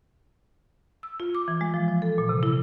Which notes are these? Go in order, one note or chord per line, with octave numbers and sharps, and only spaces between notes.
E6
F4
D6
E3
G#3
F3
F3
A4
A#2
C3
E4